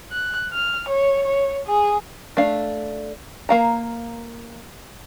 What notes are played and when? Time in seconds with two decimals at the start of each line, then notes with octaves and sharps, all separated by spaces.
0.11 F#6
0.53 F6
0.89 C#5
1.25 C#5
1.67 G#4
2.37 A3 D4 F5
3.49 A#3 F5 A#5